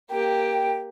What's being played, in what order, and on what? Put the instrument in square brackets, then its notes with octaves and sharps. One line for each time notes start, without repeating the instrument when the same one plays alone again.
[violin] A#3 G4 [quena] G5